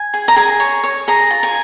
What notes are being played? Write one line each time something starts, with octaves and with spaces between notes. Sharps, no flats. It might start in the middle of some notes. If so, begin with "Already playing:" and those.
Already playing: G#5
G#4
A#5
G#4 G#5
C#5
C#5
G#4 A#5
F4
G#5